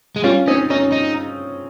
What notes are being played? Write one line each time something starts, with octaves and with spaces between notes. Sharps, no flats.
G#3
G3 C#4 F4
C4 C#4 D#4
C#4 D#4
D#4